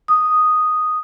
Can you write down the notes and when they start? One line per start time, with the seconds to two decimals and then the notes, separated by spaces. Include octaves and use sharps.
0.08 D#6